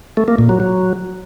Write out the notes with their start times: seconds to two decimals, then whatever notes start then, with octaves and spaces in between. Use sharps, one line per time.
0.17 A3
0.28 A#3
0.39 A#2
0.49 F#3
0.60 F#3